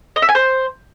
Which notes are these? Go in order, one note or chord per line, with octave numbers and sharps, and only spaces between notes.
D#5
E5
G#5
C5